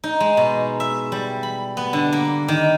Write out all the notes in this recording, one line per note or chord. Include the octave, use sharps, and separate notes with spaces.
D#4
G#3
B2
E5
G3
B5
B3
D3
A#3
D#3